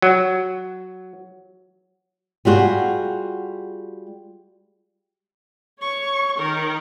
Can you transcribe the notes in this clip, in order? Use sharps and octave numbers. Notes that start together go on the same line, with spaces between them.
F#3
G3 F4 F#4 G#4
C#5 C#6
D#3 A#4